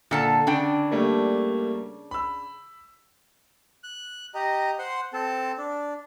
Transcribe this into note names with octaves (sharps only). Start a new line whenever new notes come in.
A#2 D3 A4 A5
C#3 D4 G5
G3 A3 A#3
B5 E6
F#6
G4 D#5 A#5
C5 F#5 C6
C4 A4 A5
D4